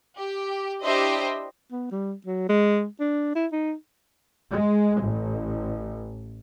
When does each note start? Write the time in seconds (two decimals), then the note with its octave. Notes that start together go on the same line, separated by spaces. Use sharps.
0.16 G4
0.83 D4 E4 G4 C5 D#5 E5
1.72 B3
1.91 G3
2.26 F#3
2.49 G#3
3.00 D4
3.35 E4
3.52 D#4
4.50 G#3
5.02 A1